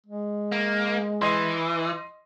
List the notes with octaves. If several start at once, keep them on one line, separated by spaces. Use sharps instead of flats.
G#3
A#3
E3 D#5 C6